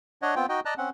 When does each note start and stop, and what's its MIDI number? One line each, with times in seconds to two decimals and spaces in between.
0.22 0.35 62
0.22 0.35 73
0.22 0.35 75
0.22 0.35 78
0.36 0.46 59
0.36 0.46 60
0.36 0.46 65
0.36 0.46 79
0.49 0.60 63
0.49 0.60 66
0.49 0.60 75
0.49 0.60 79
0.65 0.74 74
0.65 0.74 75
0.65 0.74 81
0.65 0.74 82
0.65 0.74 90
0.78 0.90 60
0.78 0.90 61
0.78 0.90 78